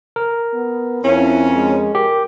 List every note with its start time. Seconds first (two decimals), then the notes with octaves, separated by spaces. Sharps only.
0.16 A#4
0.54 B3
1.04 F2 C#4 E4
1.55 G#3
1.95 G4 A#4